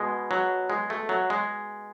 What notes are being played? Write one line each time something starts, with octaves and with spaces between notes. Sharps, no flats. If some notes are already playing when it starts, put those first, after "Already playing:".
Already playing: B2 G#3
F#3
G#3
A3
F#3
G#3